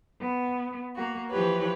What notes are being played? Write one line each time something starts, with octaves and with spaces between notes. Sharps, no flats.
B3
A#3 F#4
E3 F3 G4 B4 C#5